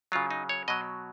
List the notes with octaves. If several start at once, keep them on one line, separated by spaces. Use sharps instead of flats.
C#3 F#3 F4
D#4
C#5
B2 F#3 D#5